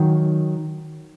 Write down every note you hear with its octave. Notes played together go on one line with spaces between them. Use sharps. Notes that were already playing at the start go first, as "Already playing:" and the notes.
Already playing: D#3 F#3